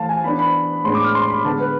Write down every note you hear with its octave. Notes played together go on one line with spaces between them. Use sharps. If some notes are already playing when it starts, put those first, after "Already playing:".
Already playing: E3 A3 F5 A5
G#5
E3 B3 D4 B5
B5
A2 G#3 B3 D4 C6
D6
F6
C6
B5
D3 G#3 B3 A5
B4